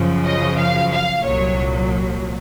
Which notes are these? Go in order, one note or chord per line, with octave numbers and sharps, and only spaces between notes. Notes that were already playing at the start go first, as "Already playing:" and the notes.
Already playing: F#2 C#3 F3
D#5
F5
F5
C2 A#2 F#3 C#5